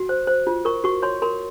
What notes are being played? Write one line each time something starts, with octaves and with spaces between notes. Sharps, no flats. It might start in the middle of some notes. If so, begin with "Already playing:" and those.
Already playing: F#4
C5
C5
F4
A#4 C#6
F#4 C#6
C#5 C6
A#4 C6